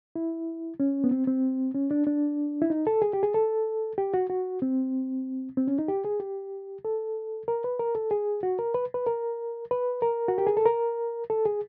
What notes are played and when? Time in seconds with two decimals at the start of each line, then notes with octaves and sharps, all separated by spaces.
0.16 E4
0.80 C#4
1.04 B3
1.11 C4
1.27 C4
1.74 C#4
1.91 D4
2.07 D4
2.62 E4
2.70 D#4
2.87 A4
3.02 G#4
3.13 G4
3.23 G#4
3.34 A4
3.98 G4
4.14 F#4
4.30 F#4
4.62 C4
5.57 C4
5.68 C#4
5.79 D#4
5.88 G4
6.05 G#4
6.20 G4
6.85 A4
7.48 A#4
7.64 B4
7.79 A#4
7.95 A4
8.11 G#4
8.43 F#4
8.59 A#4
8.74 B4
8.94 B4
9.07 A#4
9.71 B4
10.02 A#4
10.28 F#4
10.38 G4
10.47 G#4
10.57 A4
10.66 A#4
11.30 A4
11.45 G#4